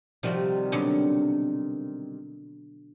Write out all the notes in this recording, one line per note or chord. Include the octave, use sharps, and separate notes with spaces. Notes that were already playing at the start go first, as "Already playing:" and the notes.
C3 D#3 F3 G3 F#4
B2 D3 F#3